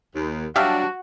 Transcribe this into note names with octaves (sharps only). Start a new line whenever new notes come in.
D#2
F#3 G3 D4 F#4 G4 E5 F5